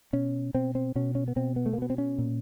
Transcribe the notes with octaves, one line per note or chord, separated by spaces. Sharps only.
B2 C#4
B2 C4
C4
B2 C#4
C#4
B3
B2 C4
B3
A3
A#3
B2 B3
C4
C#4
A#2